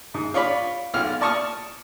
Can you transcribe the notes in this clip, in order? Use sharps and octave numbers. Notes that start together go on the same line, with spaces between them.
G#2
F4 C#5 D5 B5
B1 F4 F6
D5 A5 C#6 D#6 F6